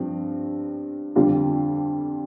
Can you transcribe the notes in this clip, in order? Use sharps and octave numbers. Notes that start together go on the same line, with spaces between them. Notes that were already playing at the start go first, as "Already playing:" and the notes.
Already playing: G2 F3 C4
F2 D3 G3 D4 F4